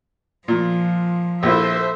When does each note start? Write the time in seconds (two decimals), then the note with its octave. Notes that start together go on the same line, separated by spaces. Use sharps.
0.48 A#2 F3
1.43 A#1 E4 A4 C5 E5